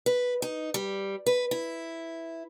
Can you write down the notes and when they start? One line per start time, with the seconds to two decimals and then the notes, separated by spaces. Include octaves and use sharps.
0.06 B4
0.42 D#4
0.74 G3
1.26 B4
1.51 E4